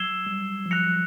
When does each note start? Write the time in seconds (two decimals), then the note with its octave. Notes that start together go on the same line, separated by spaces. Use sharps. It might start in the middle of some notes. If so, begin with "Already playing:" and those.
Already playing: F#3 E6 G#6 C7 E7 G7
0.26 G3
0.66 F3
0.71 F#3 F#6 A#6 C#7 F7